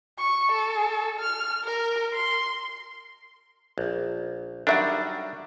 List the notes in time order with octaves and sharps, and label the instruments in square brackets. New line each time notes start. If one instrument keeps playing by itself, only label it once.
[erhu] C#6
A4
F6
A#4
C6
[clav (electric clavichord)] A#1
[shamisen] D#3 E5 F#5 [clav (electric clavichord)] F#3 G3 D4